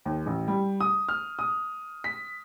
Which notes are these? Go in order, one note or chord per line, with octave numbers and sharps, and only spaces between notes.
D#2
A1
G3
D#6
F6
D#6
B6